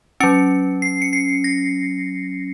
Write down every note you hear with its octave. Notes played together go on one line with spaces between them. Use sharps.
F#3 C#4 C#7
C7
C#7
C7
A#6